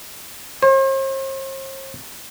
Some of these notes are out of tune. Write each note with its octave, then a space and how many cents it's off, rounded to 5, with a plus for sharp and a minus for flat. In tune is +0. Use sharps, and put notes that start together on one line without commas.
C5 +45